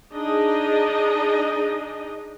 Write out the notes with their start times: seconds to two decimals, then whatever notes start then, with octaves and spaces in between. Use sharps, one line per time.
0.13 D4 D#4 G#4 D#5